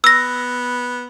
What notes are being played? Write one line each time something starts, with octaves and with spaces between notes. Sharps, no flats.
B3 E6 A#6